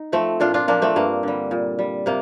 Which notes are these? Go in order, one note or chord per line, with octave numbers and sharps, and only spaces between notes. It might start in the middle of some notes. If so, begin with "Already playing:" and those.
Already playing: D#4
F3 A3 C4
A#2 D4 F4
D4 F4
F3 A#3 D4
A3 C4
G2 A#3
D3 G3
A#2
G3
C3 A#3